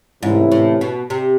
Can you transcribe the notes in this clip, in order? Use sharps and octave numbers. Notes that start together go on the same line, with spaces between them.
G#2 C3 E3 A3 C#4 E4
A2
B2
C3